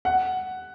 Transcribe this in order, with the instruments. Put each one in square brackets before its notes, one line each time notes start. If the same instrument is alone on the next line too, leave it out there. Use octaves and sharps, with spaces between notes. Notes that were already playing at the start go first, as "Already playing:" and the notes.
[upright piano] F#5